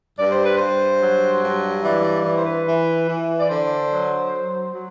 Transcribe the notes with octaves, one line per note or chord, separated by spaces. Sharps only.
G2 D5
C5
B4
G2 C5
F#3
G2
E3 D5
D5
E3
C5
B4
E3
E3
D5
D3 C5
F#3
F#3
F#3